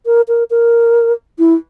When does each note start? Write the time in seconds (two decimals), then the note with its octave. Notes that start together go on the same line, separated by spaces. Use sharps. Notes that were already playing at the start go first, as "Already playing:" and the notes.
0.06 A#4
0.28 A#4
0.50 A#4
1.39 E4